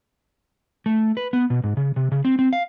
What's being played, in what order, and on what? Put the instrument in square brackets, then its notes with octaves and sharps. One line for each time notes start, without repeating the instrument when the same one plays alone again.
[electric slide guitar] A3
B4
B3
B2
G#2
C#3
C3
C#3
C4
C4
F5